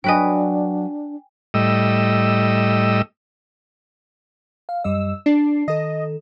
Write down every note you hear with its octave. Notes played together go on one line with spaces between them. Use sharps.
F#3 D4 B4 D#5 G5 G#5
A2 G3 D#5 E6
F5
F#2 G3 D#5 E6
D4 C7
D#3 A4 D#5